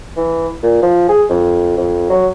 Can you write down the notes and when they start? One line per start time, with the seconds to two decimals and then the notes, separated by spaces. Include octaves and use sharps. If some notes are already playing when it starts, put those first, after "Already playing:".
0.17 E3
0.63 A#2
0.82 F3
1.09 G#4
1.29 F2
1.77 F2
2.10 F#3